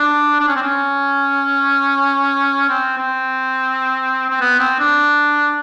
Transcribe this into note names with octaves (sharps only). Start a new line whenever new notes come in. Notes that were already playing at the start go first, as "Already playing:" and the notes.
Already playing: D4
D4
C#4
C4
C#4
C4
C4
C4
B3
C4
D4